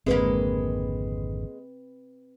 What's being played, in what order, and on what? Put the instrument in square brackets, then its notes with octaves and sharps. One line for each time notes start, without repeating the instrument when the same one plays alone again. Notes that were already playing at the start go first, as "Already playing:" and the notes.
[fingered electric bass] G#1 F2 D3 [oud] G#3 A#3 [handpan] C4 B4